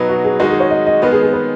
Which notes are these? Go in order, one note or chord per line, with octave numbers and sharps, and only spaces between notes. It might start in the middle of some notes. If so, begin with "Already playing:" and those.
Already playing: B2 F#3 D#4 B4
F#4
G#4
D#3 G#3 D#4 F#4
G#4
C#5
D#5
D#5
D#3 G#3 B3 B4
G#4
G#4
B4